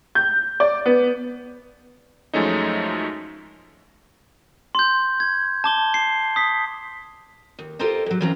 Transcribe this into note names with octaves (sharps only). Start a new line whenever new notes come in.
G6
D5
B3
F#2 F3 G#3 A3 C#4 D#4
C6 G6
G#6
A5 D6 G7
C7
D#6 B6
D#2
F4 G4 A4 A#4 C5 D#5
G#2 F#3
E3 A#3 C4 C#4 F4 A#5